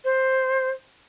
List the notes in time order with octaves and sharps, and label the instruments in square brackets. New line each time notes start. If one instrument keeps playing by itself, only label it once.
[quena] C5